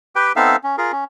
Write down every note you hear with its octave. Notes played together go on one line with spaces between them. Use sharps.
G4 B4 G5
B3 C4 D#4 A4 E5 F5
C#4
F4 G#4 A#4
C#4